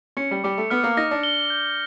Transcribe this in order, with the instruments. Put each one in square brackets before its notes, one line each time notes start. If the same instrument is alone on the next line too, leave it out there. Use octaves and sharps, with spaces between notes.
[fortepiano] C#4 [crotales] C#7
[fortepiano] G3
[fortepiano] G3 [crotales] D6
[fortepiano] A3
[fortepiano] B3 [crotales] F6
[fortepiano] A#3
[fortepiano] D#4 [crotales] A#6
[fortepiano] D4
[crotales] G7
G6